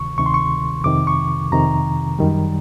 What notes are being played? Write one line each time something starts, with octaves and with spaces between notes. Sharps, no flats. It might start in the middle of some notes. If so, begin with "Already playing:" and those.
Already playing: D2 C3 D#3 C#6
D2 C3 D#3 C#6
C6
C#6
F2 C3 D#3 D6
C#6
F2 C3 D#3 A#5
F#2 D#3 G3